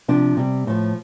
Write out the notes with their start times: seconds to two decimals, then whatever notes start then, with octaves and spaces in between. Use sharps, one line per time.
0.08 C3 F3 D4
0.37 C3 G3
0.67 A2 F3